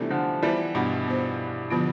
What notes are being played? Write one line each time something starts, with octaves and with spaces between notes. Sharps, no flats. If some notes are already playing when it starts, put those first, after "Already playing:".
Already playing: C3 E3 G3 A3 B3 D4 F4
D3 F3
E3 G3 B3 F4 C5
G2 B2
B3 F4 C5
D3 F3 B3 F4